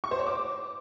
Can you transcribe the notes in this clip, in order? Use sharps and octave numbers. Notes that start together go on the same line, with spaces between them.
C#6
C5
C#5
D6